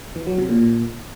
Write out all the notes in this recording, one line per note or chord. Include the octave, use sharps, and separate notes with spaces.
E3
F#3
C3
A#2